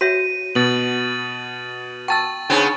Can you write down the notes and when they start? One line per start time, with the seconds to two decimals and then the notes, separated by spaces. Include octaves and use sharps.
0.01 F#4 C#5 E5 D#7
0.55 B2 B3 A6 F#7
2.08 G5 A5 C#6 E6 A6
2.50 C#3 B3 C4 D4 D#4